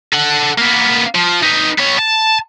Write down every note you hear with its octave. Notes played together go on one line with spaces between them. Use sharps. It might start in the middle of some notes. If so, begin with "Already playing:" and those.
A4 F#5
A#3 B3
F3
D#4 B4
B3 C#5
A5